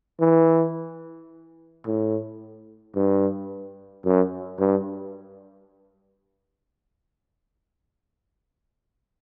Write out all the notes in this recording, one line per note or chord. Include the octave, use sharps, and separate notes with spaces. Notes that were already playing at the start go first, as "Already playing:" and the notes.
E3
A2
G2
F#2
G2